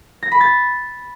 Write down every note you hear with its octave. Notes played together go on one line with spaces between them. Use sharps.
A#6
B5
A6